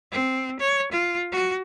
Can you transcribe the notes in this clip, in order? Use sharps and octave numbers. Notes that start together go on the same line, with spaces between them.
C4
C#5
F4
F#4